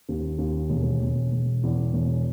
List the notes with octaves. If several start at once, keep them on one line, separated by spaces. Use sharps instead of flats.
D#2
D#2
E1
E1
E1
E2
E1